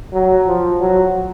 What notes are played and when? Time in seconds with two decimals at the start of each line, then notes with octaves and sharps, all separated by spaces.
0.13 F#3
0.47 F3
0.80 F#3